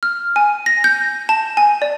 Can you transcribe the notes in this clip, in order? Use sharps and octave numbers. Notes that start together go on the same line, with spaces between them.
F6
G#5
A#6
G6
A5
G#5
D5